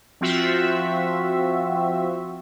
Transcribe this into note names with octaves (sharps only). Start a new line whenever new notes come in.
F3 C4 F4 F#4 E5